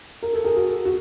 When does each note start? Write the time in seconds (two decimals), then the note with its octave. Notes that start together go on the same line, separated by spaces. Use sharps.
0.23 A#4
0.33 A4
0.44 G#4 A#4
0.56 F#4
0.85 F#4